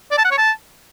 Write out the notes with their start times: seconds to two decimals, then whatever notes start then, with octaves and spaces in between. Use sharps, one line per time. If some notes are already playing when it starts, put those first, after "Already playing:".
0.11 D5
0.18 A5
0.25 F#5
0.31 C#5
0.38 A5